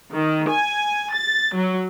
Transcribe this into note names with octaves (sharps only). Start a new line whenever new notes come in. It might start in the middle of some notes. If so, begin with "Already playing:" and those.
D#3
G#5
A6
F#3